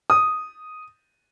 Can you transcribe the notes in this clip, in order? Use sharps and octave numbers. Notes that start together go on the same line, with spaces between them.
D#6